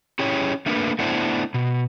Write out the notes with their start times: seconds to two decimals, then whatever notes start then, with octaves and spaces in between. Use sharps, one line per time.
0.19 C#4 E4 G4 G#4 C#5
0.66 A3 A#3 D4 A#4 B4
0.99 A3 B3 D4 E4 C5
1.54 B2